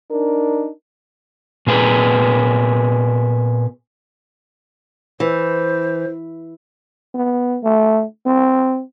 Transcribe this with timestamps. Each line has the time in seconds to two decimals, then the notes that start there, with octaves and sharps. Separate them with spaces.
0.11 D4 D#4 A#4
1.67 A#2 B3 G#4 B4
5.20 E3 C5
7.14 B3
7.64 A3
8.26 C4